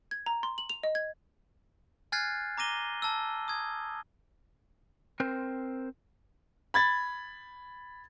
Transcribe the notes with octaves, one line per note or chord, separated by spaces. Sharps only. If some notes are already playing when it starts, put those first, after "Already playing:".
G#6
A#5
C6
F#7
F7
D#5
G#6
G#5 F6 F#6 G#6 A6 C7
A#5 D6 A#6 D#7 G7
A5 E6
D#6 G#6
C4 A#4 C5
B5 G#6 A6